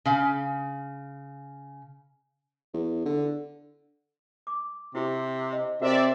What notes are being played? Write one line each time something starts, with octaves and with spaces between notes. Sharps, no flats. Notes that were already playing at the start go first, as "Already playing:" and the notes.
C#3 F5
E2
D3
D6
C3 E4 F#4 G4
D#5
C3 C4 F#4 A#4 D5 E5